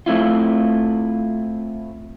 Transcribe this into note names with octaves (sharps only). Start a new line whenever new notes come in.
A3 C4 E4 F4